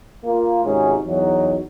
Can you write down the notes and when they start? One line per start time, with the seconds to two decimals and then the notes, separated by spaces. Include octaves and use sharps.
0.24 A#3 F4
0.64 G#1 G#2 C3 C#4 D#4 G#4
1.05 E2 F#3 D#4